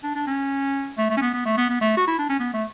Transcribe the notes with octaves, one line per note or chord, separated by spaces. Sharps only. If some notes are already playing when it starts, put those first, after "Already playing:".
D4
D4
C#4
A3
A3
C#4
B3
B3
A3
B3
B3
A3
F#4
E4
D4
C#4
B3
A3